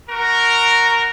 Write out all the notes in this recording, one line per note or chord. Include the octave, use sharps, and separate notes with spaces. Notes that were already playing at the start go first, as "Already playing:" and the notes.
F#4 A#4